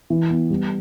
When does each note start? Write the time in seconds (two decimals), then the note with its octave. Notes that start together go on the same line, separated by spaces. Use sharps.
0.10 E3
0.30 B3
0.50 G3